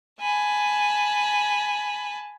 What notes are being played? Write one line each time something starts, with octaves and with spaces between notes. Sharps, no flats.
G#5 A5 B5